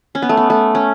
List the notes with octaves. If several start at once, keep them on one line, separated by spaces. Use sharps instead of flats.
C#4
B3
A3
B3
A3
C#4